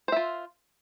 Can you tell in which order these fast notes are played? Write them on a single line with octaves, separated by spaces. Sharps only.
C5 E5 F4